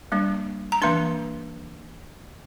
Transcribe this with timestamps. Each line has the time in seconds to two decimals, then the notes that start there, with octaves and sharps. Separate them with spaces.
0.12 G3 A#3 D4
0.72 A#5
0.82 E3 A#3 D4 C6